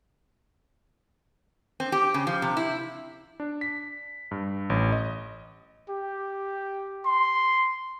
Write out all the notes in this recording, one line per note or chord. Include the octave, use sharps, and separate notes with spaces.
C4
G4
C#3
F3
C3
E4
D4
B6
G2
A1
D#5
G4
C6